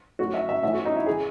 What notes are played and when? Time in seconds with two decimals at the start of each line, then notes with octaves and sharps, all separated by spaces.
0.19 A2 F#3 F#4
0.34 E5
0.49 E5
0.63 A2 E3 E5
0.73 F#4
0.85 D#4
0.96 E4
1.06 E3 G#4